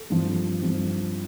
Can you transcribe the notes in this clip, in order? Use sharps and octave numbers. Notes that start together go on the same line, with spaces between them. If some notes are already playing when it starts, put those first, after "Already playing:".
Already playing: A4
G2 F3 C4
G2 F3 C4